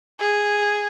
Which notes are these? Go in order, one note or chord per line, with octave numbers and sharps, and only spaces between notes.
G#4